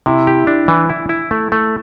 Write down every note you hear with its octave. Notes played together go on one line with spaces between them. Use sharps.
C3 E4
G4
D4
E3
E4
E4
A3
A3